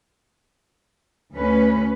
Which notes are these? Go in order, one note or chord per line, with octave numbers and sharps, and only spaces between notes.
D2 C#4 B4